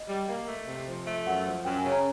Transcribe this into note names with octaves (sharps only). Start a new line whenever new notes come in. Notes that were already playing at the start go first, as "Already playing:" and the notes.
Already playing: D#5
G3
A#3
A3
C3
F3
A3
F#2 F#5
F3
F#2 G5
G#5
C#3
A#5